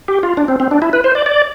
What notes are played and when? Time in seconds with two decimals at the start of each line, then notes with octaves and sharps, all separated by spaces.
0.08 G4
0.23 F4
0.37 D4
0.48 C4
0.60 C4
0.71 D4
0.82 E4
0.93 B4
1.04 C5
1.15 D5
1.26 D5